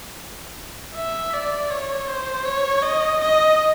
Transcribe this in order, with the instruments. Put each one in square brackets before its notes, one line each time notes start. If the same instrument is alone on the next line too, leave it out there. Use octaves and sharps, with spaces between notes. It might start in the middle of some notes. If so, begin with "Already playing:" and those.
[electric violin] E5
D5
C#5
C5
C#5
D#5
D#5